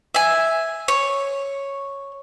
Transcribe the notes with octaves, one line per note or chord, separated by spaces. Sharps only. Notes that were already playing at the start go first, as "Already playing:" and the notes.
E5 G#5
C#5